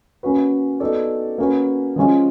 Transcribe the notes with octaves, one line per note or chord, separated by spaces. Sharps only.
A#3 C#4 F#4 B4
B3 D#4 F#4 A4 D5
A#3 C#4 F#4 B4
F3 G#3 C#4 F4